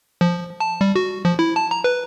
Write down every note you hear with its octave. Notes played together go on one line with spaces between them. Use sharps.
F3
A5
G3
F#4
F3
E4
A5
A#5
B4